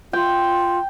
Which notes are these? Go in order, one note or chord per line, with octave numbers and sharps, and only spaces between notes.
F4 G5